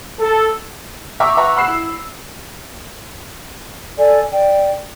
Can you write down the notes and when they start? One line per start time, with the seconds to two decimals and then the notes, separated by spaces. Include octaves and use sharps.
0.20 A4
1.20 E5 G5 A#5 C#6 D6 E6
1.37 B4 E5 F#5 A#5 C#6
1.56 F#5 B5 E6 C7 E7
1.68 E4
3.98 A4 D5 G#5
4.32 D5 G5